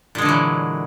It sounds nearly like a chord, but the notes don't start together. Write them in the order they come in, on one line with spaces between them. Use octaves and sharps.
A#2 G#3 D3 F#3 E3